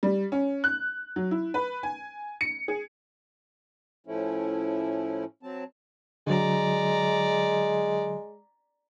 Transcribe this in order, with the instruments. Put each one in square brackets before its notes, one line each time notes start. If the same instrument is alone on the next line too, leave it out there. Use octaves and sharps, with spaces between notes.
[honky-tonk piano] G3
C#4
F#6
F#3
E4
B4
G#5
C#7
G#4
[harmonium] A2 F3 A3 C#4 E4
F#3 C4 A5
[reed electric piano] D3 F#3 [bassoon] G#3 [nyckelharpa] D5 A#5